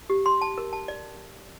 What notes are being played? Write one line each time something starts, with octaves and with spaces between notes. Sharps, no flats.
G4
C6
A5
A#4
A5
D5